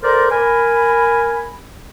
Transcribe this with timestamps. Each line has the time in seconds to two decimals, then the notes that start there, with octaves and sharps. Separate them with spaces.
0.03 A4 A#4 C5 D5 A#5 C6
0.31 A#4 G#5 B5